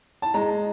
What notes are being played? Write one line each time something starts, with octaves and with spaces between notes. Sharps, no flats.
A5
G#3 A#5